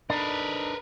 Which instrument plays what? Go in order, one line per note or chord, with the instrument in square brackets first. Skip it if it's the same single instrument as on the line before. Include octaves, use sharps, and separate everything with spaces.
[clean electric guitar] D4 D#4 [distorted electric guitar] A#4 B4